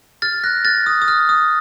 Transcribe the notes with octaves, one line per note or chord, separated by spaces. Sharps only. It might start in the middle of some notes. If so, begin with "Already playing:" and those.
F6 A6
F#6 A#6
F6 A6
D#6
D#6
F6
D#6